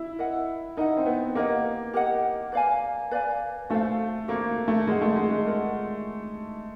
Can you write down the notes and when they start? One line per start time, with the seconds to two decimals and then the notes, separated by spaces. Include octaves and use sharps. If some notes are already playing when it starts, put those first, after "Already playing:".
Already playing: E4
0.18 A#4 D#5 F#5
0.77 D#4 A#4 D#5 F#5
0.97 C4
1.06 B3
1.35 A#3 G4 A#4 D#5 F#5
1.94 G4 A#4 D#5 F#5
2.52 B4 D5 F5 G#5
3.11 B4 D5 F5 G#5
3.70 A3 F#4 A4 C5 F5
4.28 A#3 F#4 A4 C5 F5
4.68 A3
4.87 G#3 F4 A#4 D5 F#5
5.01 A3
5.16 G#3
5.30 G#3
5.46 F4 A#4 D5 F#5